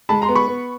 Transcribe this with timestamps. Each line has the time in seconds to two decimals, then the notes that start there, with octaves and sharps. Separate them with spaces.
0.09 G#3 A5 B5
0.22 A#5 C6
0.29 B3
0.35 B5 C#6
0.48 B3